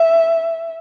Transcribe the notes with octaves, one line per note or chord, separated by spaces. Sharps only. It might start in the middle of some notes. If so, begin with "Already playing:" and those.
Already playing: E5